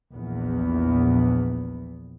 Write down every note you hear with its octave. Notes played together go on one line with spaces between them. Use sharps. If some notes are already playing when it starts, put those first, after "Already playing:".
A#1 E2 B3